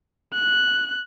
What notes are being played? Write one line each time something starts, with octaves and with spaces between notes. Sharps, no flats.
F#6